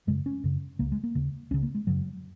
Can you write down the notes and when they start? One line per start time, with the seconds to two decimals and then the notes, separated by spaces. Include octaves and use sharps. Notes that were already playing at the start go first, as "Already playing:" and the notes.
0.07 F#2 C#3 G#3
0.26 C#4
0.44 F#2 C#3
0.79 C#2 C#3 A#3
0.92 G#3
1.04 A#3
1.15 D#2 C#3
1.51 C#2 C#4
1.54 C#3
1.62 A#3
1.75 G#3
1.87 F#2 C#3 F#3